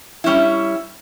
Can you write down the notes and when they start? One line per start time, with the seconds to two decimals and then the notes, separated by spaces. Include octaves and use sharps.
0.24 G3 C#4 E4